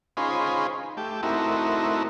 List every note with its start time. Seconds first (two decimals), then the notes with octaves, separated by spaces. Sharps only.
0.17 C#4 D#4 F4 G#4 C5 B5
0.97 A3 G4
1.23 A3 C4 D#4 E4 F#4 A#4